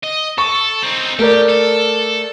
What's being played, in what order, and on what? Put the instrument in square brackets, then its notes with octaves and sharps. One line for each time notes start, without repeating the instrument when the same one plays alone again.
[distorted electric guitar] D#5
[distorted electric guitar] A4 [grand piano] C#6
[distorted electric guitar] C4 D#4
[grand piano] A3 A#4 D5 [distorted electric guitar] G4
[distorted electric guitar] A4